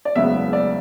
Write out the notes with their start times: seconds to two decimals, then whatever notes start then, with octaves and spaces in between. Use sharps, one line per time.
0.05 D5
0.15 F#1 E2 C#3 G#3 B3 E5
0.53 D5